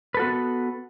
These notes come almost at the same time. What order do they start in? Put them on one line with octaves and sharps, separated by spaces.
B4 A4 F#4 B3